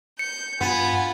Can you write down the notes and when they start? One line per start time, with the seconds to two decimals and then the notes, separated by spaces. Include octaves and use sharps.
0.19 G6 C#7
0.61 G2 B3 F4 G#5 B5